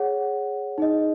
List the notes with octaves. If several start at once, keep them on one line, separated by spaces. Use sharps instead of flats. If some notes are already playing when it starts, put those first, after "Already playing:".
Already playing: G#4 C#5 F#5
D#4 G#4 D#5